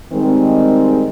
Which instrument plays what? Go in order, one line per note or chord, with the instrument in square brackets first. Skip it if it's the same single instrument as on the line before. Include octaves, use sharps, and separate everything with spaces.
[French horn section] D#3 G3 G#3 C4